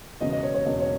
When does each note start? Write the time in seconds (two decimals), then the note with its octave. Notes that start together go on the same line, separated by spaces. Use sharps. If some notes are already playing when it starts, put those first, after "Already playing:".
0.21 E1 E2 C#3 D#5
0.32 D#5
0.43 C#5
0.54 C#5
0.65 E1 E2 C#3 D#5
0.80 C#5